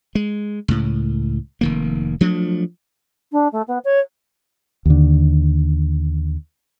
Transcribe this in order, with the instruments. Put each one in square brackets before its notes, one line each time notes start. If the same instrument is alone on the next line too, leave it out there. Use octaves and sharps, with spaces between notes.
[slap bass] G#3
C#2 A2
F1 D#3 A#3
F3 F#3 A3 D4
[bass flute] D4
A3
B3
C#5
[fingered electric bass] D#2 D3